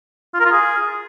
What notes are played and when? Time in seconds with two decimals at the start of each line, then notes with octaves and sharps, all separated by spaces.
0.34 F4
0.40 A#4
0.45 F4
0.51 G#4